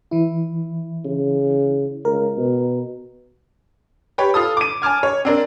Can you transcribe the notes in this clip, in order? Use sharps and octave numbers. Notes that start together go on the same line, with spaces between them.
E3 E4
C#3
C#2 A#4
B2
G4 B4 C#5
F4 A4 D#6
D6 D#7
G#5 A5 D6 F6 G#6
C#5
C4 D4 A#4